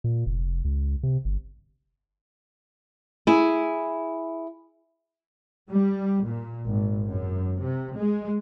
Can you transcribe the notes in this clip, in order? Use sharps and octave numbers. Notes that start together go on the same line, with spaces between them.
A#2
F1
C#2
C3
G1
E4 G#4
G3
A#2
G#1
F#2
C3
G#3